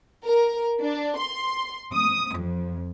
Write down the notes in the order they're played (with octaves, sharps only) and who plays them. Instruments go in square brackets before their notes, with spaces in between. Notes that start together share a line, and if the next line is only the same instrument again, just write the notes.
[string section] A#4
D4
C6
D#6
F2